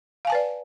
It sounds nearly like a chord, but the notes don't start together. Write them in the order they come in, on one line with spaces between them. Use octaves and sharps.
F5 G#5 A5 B4 D5